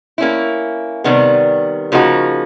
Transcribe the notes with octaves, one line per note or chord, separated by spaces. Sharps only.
A#3 C#4 E4
C3 D#3 G3 B3
C#3 F3 A#3 D#4 F#4